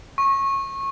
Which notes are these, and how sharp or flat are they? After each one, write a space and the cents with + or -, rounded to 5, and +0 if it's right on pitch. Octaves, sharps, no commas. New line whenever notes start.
C#6 -20